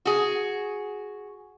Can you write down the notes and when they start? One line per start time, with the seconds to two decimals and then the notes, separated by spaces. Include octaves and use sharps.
0.05 F#4 G#4